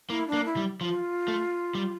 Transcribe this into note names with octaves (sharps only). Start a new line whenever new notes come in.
A#3 E4
D4
A#3
E4
G3
F3 F4
A3
G3